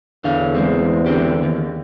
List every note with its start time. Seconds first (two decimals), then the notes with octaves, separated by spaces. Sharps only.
0.24 E2 D3 F5
0.55 E3 G#3 C4
1.06 D3 C4 G4
1.43 D#2